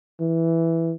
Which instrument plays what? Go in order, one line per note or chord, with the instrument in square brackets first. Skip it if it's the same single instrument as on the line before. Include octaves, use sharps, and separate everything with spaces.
[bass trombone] E3